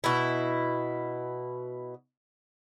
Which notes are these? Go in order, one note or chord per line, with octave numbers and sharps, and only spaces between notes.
B2 E4